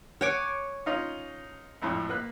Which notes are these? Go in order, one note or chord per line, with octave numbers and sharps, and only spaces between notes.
C#5 F#5 G#5 D6
C#4 D#4 F4
G#1 F2 A2
A#3 B4 F#6